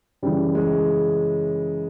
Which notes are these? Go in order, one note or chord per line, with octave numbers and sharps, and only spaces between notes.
F#2 C#3 E3 G3
G#3